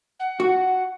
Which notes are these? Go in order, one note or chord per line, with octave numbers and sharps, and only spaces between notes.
F#5
F#4